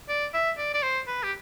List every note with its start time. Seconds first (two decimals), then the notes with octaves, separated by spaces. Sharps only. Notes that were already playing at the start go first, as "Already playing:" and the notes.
0.09 D5
0.34 E5
0.58 D5
0.74 D5
0.83 C5
1.08 B4
1.23 G4